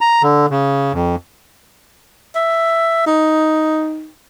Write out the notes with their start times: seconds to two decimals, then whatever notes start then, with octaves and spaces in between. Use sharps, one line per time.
0.01 A#5
0.23 D3
0.50 C#3
0.93 F2
2.35 E5
3.06 D#4